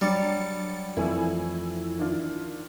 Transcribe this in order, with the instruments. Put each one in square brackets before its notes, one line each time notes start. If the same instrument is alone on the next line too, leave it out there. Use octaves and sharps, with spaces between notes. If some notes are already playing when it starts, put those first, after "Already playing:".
[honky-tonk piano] G2 [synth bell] F#3 A6 C#7 [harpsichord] G3
[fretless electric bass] F2 E3 F3 [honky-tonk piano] A3 G#5 E6 [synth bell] E4
[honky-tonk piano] D#3 D4 F4